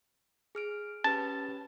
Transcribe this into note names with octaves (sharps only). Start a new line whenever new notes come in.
G#4 F6 D7
C#4 G4 B4 A5